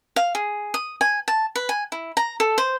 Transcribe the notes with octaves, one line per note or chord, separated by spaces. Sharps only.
F5
G#4
D#6
G#5
A5
B4
G#5
E4
A#5
A4
C5